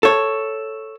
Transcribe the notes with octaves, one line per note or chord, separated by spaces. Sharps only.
A4 C#5